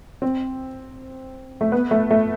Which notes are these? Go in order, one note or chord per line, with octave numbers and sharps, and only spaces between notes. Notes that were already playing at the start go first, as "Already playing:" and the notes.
C4
A3
B3
A3
A3